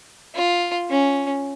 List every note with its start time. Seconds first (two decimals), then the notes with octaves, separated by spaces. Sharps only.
0.35 F4
0.90 C#4